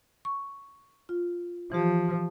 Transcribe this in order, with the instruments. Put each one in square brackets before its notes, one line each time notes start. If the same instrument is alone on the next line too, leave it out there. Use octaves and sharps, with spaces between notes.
[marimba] C#6
F4
[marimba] E3 G4 [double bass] F3